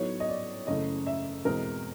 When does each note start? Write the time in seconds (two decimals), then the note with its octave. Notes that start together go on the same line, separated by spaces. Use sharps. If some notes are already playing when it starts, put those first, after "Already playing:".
Already playing: A2 F#3 B3 D#4 C#5
0.20 D#5
0.29 D5
0.67 F#1 F#2 C#3 E3 A3 D#5
1.07 E5
1.45 E2 B2 G#3 C4 A#4